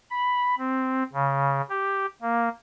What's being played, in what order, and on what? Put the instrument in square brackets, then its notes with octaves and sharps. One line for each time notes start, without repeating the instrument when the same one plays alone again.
[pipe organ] B5
C4
C#3
G4
A#3